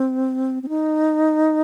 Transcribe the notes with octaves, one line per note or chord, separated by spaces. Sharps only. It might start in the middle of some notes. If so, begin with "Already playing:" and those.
Already playing: C4
C4
D#4